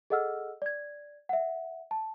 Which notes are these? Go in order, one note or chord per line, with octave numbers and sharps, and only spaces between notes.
G#4 A4 D#5 F#5 E6 F6
D5 G#6
E5 F#5
A5